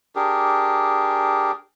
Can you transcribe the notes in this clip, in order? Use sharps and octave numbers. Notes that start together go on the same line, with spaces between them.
D4 G4 G#4 A#4